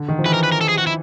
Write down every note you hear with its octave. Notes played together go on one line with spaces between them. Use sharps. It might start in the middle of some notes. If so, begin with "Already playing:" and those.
Already playing: D3
D#3
F3
E3 B4
A#4
B4
A#4
A4
G#4
F#4
E4